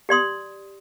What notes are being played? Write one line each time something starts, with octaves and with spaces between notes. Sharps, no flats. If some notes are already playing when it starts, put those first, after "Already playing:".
G4 D5 C6 D#6